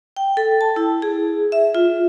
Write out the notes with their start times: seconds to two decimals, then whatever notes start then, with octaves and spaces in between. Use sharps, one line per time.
0.17 G5
0.37 A4
0.61 A5
0.76 E4
1.02 G#4
1.52 E5
1.75 F4